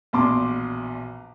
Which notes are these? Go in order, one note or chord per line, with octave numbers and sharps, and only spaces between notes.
A#1 E2 B2 A5 C6 D6